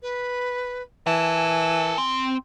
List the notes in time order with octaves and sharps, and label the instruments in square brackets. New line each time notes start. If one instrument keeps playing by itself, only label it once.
[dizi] B4
[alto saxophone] E3 [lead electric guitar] A#4 A5 [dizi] G#5
[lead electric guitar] C4